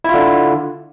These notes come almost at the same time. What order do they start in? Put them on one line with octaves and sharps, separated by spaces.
E4 F4 D3